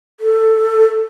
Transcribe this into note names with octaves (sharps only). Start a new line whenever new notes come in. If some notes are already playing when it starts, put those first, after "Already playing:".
A4